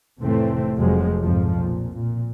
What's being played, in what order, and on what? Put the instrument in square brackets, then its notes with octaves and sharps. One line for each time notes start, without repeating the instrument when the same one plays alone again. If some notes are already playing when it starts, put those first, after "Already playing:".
[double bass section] F1 A2 C3 E3 A3 C4
F1 F2 C3 F3 F#3 G#3
B1 F2 G#2 F3
A#2
A#2